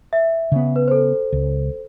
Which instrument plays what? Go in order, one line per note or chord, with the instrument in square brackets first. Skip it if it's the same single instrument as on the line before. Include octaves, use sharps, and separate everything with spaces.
[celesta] E5
[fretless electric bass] C#3 B3
[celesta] B4
A4 C5
[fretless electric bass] C#2